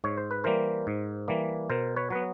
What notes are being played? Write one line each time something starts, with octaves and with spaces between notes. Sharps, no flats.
G#2 C#5
C5
B4
E3 G3 A#3 A#4 C5
G#2
E3 G3 A#3
B2 A#4 C5
B4 C#5
F#3 B3 B4